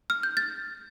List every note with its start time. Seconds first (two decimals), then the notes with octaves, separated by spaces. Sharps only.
0.10 F6
0.23 G6
0.37 A6